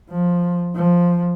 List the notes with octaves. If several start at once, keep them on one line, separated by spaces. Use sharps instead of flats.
F3
F3